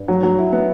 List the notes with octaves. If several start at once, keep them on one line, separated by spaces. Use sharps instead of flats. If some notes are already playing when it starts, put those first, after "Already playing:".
Already playing: G2
F#3
F#3
E4
B3